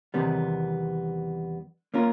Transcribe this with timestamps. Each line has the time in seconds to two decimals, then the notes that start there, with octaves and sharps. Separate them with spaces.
0.14 E2 C3 D#3 G3 B3
1.94 A#3 C#4 F4 A#4